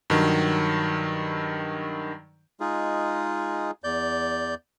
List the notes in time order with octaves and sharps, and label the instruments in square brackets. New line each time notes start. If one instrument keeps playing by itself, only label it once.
[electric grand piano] G2 D#3 F#3
[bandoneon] G#3 D#4 F4 G#4
E2 D5 G6